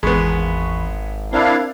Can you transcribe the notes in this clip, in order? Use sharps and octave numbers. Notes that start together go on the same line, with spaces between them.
G#1 E2 G#3 B3 B5 C#6
C4 D4 E4 A#4 F5